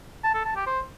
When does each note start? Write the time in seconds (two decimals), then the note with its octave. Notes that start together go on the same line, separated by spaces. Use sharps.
0.24 A5
0.34 A4
0.45 A5
0.56 G4
0.66 C5